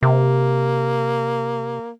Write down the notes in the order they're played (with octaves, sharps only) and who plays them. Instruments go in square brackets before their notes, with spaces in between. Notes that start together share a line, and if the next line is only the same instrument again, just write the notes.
[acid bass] C3 [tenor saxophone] A#3